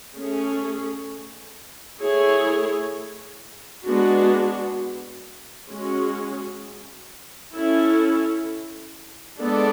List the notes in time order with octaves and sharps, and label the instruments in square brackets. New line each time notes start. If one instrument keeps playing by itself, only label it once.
[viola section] A3 C#4 G#4
A3 E4 G#4 C#5
G#3 B3 D4 F#4
G#3 C#4 F#4
C#4 E4 A4
G#3 B3 D4 A4 D5